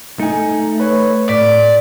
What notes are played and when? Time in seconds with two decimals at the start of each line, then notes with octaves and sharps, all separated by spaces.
0.19 A3 D#4 G#5
0.80 B4 C#5
1.29 A2 D5 B6